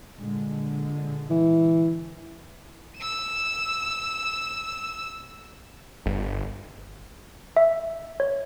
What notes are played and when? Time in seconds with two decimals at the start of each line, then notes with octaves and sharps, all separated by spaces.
0.17 A#2 D3 G#3
1.30 E3
2.98 E6 E7
6.06 G1
7.57 E5
8.20 C#5